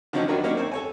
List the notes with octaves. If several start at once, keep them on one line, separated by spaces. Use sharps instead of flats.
D3 F3 F#3 C4 C#4 D#4
D#3 F#3 D4 F#4 A#4 B4
F#3 A#3 C#4 D#4 C#5 D5
C4 C5 C#5
A4 C#5 G#5